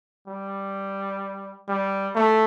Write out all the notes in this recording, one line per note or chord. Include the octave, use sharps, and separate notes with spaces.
G3
G3
A3